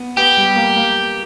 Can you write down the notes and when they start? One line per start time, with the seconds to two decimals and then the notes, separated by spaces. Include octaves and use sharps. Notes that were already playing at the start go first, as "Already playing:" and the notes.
Already playing: B3
0.17 B3 G4
0.37 G3
0.56 A#3
0.76 A#3